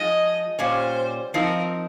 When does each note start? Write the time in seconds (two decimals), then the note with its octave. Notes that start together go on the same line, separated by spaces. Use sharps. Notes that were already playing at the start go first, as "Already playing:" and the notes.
Already playing: F3 G#3 D#4 D#5
0.59 A#2 G3 C#4 C5
1.34 F3 C4 D#4 A#4